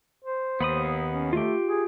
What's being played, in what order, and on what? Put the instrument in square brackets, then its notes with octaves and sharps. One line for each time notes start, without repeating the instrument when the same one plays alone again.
[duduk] C5
[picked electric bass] D#2 [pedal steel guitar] B3 B5 D#6
[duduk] C#4
[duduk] A3 [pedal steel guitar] F4 G4
[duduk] G#4